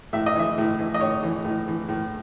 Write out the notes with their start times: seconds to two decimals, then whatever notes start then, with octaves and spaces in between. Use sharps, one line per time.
0.13 A2 E5
0.26 D#5
0.36 E3 E5
0.58 A2
0.79 E3
0.94 D#5
1.01 A2 C#5
1.23 E3
1.45 A2
1.67 E3
1.88 A2